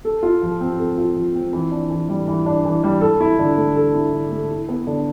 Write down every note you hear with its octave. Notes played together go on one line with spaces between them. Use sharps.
A4
F4
F3
C4
A4
F4
F3
C4
E3
D4
E3
G3
E3
D4
E3
G3
A4
E4
D3
A3
A4
E4
D3
A3
E4
B3
D3